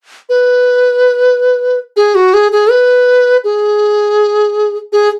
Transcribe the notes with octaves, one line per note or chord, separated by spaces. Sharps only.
B4
G#4
F#4
G#4
G#4
B4
G#4
G#4